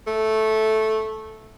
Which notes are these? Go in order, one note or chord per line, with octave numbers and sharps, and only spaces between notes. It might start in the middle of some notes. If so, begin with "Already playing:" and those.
A3